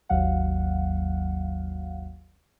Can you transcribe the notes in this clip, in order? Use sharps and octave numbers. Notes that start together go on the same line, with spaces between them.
G#1 D#2 F#3 F5 F#5